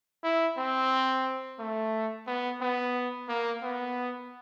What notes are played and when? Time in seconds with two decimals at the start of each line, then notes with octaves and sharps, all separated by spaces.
0.23 E4
0.58 C4
1.59 A3
2.27 B3
2.61 B3
3.29 A#3
3.63 B3